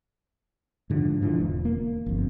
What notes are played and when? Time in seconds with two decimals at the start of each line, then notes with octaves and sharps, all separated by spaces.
0.90 G#2 D3 F3
1.22 G#2 D3 E3 F3
1.37 E1
1.65 A#3
2.06 G1 F2